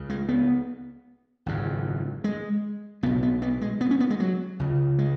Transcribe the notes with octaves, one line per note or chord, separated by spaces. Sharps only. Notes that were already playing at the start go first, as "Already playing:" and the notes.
Already playing: C#2 C#3
G#3
B3
G#1 F#2 C#3
G#3
B1 B2 B3
B3
B3
G#3
B3
C#4
B3
G#3
F#3
C#2 C#3
G#3